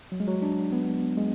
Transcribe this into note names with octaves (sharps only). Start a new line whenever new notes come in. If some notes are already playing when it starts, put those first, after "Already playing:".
F#3
G#3
F#3
D4
B3
G#3